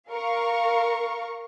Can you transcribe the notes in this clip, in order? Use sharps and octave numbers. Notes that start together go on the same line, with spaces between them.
A#4 F5 C#6